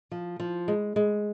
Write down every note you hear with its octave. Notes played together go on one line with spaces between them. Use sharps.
F3
F3
G#3
G#3